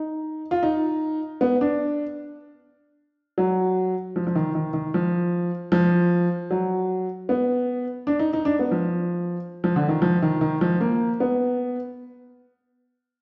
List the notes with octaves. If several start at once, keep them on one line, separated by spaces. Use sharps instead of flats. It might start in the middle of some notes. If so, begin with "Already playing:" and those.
Already playing: D#4
F4
D#4
B3
D4
F#3
F3
F3
D#3
D#3
D#3
F3
F3
F#3
B3
D4
D#4
D#4
D4
B3
F3
F3
D3
D#3
F3
D#3
D#3
F3
A#3
B3